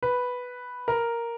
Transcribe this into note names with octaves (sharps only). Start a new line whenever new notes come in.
B4
A#4